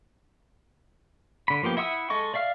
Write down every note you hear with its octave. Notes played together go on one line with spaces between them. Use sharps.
D3 B5
F3 A#3 B3 G4
E4 E5 F#5 D#6 E6
G#3 A4 D#5 C#6
D5 E5 F5 F6